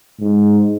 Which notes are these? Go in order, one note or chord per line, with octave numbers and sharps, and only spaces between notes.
G#2